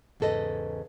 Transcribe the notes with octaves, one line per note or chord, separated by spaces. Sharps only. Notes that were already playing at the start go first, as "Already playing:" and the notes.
E2 G#2 C#3 A4 B4 D#5